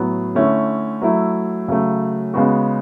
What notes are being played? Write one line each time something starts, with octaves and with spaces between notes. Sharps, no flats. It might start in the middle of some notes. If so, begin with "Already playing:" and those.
Already playing: A2 F#3 B3
D3 A3 C#4 E4
F#3 A3 E4
C#3 F#3 A3
C#3 G#3 B3 F#4